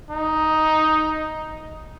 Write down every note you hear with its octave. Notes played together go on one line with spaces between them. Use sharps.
D#4